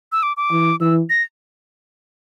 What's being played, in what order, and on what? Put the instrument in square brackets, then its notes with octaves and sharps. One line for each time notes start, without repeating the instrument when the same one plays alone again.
[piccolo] E6
D6
D6
[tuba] E3
[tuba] E3 [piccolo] E6
[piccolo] A#6